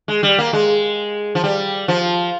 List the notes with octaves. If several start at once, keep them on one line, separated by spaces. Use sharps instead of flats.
G#3
G3
A#3
G#3
F3
G3
F3